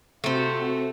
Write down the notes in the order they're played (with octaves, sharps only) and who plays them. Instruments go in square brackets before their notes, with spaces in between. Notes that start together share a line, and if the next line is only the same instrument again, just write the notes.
[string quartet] C3 F4 [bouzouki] A3 C5 [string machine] C4 F#4